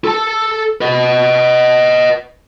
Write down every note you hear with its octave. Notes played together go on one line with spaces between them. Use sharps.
A4 A5
B4 D#5